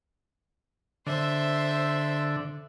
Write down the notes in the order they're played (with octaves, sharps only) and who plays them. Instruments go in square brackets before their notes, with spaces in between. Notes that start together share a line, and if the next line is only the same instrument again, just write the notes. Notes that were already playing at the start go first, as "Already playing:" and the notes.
[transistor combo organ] D3 [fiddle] C5 E5